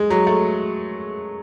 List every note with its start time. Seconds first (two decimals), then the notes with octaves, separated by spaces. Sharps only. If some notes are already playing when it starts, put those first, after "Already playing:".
Already playing: G#3
0.10 F#3
0.27 A3